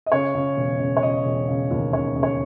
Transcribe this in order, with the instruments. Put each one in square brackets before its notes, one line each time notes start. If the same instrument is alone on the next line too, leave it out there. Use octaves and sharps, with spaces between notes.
[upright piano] D#5
C#3 C#5
C#3
E1
C#3
C#5
C#3 D#5
E1
C#3
D#2
C#3 C#5
C#3
C#5